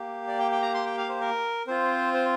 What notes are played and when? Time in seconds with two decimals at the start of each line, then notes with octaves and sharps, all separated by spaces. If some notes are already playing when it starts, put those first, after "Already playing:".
Already playing: A#3 G4
0.28 D5
0.39 G5
0.51 G5
0.62 A#5
0.74 C6
0.86 G5
0.98 F5
1.09 C5
1.21 A#4
1.67 C4 F4 C5
2.14 C5